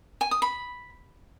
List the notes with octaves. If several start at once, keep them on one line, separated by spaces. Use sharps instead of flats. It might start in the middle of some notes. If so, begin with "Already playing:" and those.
G#5
D#6
B5